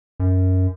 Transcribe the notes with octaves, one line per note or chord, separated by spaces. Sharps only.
F#2